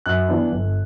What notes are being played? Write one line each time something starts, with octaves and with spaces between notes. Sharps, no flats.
F#2 F#6
E3 B3 D4
G1